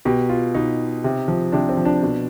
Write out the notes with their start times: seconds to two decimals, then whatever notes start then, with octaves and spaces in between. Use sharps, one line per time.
0.05 B2 G4
0.29 F4
0.54 B2 D#4
1.04 C3
1.28 F3
1.52 C3 D4
1.69 C4
1.77 F3
1.85 D4
2.03 B2